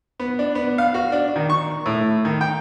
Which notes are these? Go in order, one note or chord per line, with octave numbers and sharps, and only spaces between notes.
B3
D4
B3
F5
F#4
D4
D#3
C#6
A2
D#3
G5